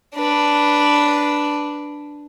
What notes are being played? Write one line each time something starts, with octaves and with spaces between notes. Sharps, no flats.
D4 B4